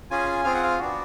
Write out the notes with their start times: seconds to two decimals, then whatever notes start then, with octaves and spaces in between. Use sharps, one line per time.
0.11 C#4 F4 G#4 G#5
0.44 C4 F4 G#4 F5
0.55 F#5
0.63 F5
0.78 B3 D4 F#4